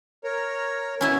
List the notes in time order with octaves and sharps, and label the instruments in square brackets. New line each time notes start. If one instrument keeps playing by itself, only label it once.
[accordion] A#4 C#5
[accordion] E2 B2 B3 [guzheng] C#4 E4 E5